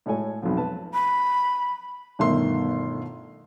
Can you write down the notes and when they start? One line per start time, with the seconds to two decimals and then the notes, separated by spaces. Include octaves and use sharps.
0.06 A2 G#3 A4 C#5 G#5
0.43 B1 F2
0.57 B4 A5
0.94 B5
2.19 G1 B2 D#3 A3 E5 C6